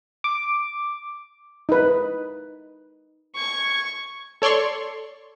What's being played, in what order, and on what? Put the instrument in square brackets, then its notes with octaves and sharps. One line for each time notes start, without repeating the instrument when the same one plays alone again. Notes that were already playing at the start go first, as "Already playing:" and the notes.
[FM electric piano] D6
[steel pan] D#4 B4
[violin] C#6 G#6
[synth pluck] A4 C#5 D5 C6 C#6